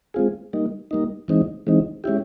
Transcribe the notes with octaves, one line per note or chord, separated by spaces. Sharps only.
G#3 C4 F4 G#4
G3 A#3 D#4
G3 A#3 D#4
E3 G#3 C4 D#4
E3 G#3 C4 D#4
G#3 C#4 E4 G4